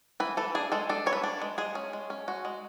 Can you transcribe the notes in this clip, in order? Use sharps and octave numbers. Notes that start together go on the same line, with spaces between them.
E3 B4
E3 A4
D4 G#4
G#3 A4
D4 A4
E3 C#5
B4
D4
G#3
G#3 G#4
C#4
G#3
C#4
G#3 F#4
G#3